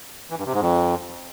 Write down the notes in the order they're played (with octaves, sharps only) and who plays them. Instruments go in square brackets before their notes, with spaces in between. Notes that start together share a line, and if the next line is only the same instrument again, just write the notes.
[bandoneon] E3
G2
C3
G#2
F2